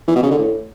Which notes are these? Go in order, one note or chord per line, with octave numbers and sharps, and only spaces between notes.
E3
B2
C#3
D3
A2